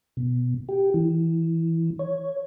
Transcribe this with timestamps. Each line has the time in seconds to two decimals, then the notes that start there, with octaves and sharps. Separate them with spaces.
0.17 B2
0.69 G4
0.94 E3
1.99 C#5